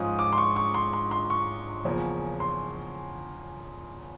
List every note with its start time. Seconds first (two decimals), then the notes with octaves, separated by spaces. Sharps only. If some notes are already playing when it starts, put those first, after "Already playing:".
Already playing: G#2 F3 G#3 C#4 F4 D#6
0.19 D6
0.33 C6
0.38 C#6
0.56 C#6
0.74 C6
0.93 C6
1.11 C6
1.30 C#6
1.84 E2 C#3 F3 A#3 C#4
2.40 C6